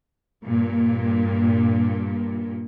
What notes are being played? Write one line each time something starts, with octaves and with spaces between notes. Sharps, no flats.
G2 A#2